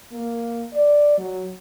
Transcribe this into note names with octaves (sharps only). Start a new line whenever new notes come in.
A#3
D5
F#3